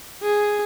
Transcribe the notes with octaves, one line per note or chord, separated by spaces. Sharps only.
G#4